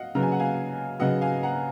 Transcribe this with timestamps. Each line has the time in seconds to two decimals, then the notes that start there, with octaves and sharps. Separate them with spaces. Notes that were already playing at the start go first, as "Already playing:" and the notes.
Already playing: D#5 F5 F#5
0.15 C#3 F#3 B3 A#5
0.22 G#5
0.32 F#5
0.39 F5 G#5
1.00 C#3 F#3 B3 D#5 F#5
1.21 F5 G#5
1.43 F#5 A#5